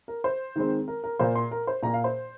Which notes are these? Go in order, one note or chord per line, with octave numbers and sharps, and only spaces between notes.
A#4
C5
D#3 G#3 C4
A#4
A#4
A#2 A#3 C5
C6
A#4
C5
A#2 A#3 A#5
F5
C5